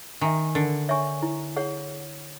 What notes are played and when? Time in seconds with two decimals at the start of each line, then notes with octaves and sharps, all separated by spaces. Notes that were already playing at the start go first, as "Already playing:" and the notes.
0.21 D#3 E5 G#5
0.55 D3 A#4
0.89 C#5 E5 G#5 C#6
1.23 E4
1.56 G#4 C#5 F#5